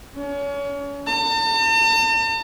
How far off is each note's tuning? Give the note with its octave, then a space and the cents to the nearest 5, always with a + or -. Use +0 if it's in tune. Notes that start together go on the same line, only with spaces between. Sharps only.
C#4 +35
A5 +45